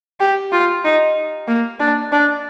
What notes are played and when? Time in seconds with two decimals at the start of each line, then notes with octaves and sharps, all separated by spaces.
0.20 G4
0.52 F4
0.85 D#4
1.48 A#3
1.80 D4
2.12 D4